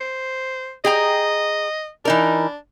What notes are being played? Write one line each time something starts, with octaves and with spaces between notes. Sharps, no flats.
C5
G#4 D#5 G5 A#5
E3 D4 D#4 A#4